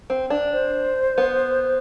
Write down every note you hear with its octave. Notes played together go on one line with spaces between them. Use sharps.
C4
D4
C5
B3